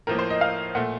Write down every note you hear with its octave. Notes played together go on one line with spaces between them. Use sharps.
A2 F3 A#3 A#4
C5
D#5
F5
A#2 A3 F#5